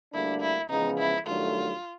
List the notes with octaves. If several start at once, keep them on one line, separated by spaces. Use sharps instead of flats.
D2 D3 G3 A#3 D4 E4
E4
E2 C#3 F3 G#3 B3 D#4
E4
G2 D#3 F#3 A3 F4